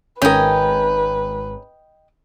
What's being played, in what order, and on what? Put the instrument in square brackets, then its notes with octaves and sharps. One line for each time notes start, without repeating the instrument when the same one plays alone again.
[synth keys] G#1 [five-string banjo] C#4 A#4 [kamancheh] B4 [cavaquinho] D#5 G5